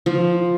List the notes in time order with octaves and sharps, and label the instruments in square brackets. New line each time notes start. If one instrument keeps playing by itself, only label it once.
[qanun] F3